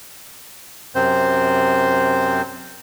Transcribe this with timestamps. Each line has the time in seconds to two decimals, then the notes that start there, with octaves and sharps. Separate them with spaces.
0.95 F#2 C3 C4 C5